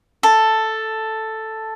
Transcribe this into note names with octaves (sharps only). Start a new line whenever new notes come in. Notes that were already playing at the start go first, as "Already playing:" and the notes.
A4